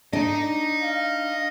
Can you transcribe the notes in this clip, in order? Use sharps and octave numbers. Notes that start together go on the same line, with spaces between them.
D4 D#5 A#5
F5